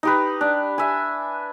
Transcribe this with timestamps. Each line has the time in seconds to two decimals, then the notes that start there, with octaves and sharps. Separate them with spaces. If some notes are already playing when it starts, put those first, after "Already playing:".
0.03 D#4 G4 B4
0.41 D4
0.78 E5 G#5